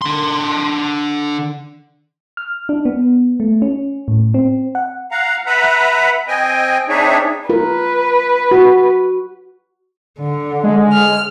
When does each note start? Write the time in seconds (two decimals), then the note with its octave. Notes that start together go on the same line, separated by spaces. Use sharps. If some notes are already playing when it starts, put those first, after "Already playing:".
0.02 D3 C6
2.37 F6
2.69 D4
2.85 B3
3.40 A3
3.62 C#4
4.08 A2
4.34 C4
4.75 F#5
5.11 F5 F#5 A#5
5.47 B4 E5 F#5 A#5 B5
6.28 C4 D#5 G5 G#5
6.89 C4 D4 D#4 G#4 C#5 E5
7.49 F4 A#4 B4
8.51 F#4
10.19 D3
10.64 G#3
10.92 F6